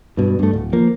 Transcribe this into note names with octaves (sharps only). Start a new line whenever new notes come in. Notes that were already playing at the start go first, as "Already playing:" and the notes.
G2 B2
G2 A3
D1
F3 A#3